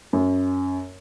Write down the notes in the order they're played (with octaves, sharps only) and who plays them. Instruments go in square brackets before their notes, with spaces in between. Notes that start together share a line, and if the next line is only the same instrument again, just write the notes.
[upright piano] F#2